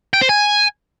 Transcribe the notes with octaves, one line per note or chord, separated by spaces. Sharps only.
G5
C5
G#5